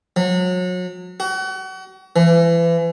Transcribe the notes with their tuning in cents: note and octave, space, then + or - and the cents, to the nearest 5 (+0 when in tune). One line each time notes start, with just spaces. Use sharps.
F#3 -30
F#4 +35
E3 +30